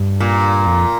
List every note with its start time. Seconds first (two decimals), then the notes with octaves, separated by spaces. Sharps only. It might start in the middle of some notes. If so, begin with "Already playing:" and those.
Already playing: G2
0.20 A#2
0.66 F2